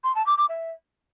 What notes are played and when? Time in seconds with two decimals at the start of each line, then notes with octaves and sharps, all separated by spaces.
0.03 C6
0.14 A5
0.26 D6
0.37 D6
0.48 E5